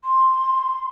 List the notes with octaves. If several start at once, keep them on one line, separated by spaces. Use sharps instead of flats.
C6